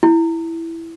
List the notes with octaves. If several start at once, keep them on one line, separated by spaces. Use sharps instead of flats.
E4